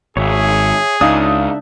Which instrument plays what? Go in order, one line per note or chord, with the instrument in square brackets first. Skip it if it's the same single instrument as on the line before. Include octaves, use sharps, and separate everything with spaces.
[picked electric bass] G#1 [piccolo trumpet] G#4 [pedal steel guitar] C#5 E5
[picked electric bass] C#2 [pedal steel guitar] D4 E5 [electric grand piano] D#4 F5 D#6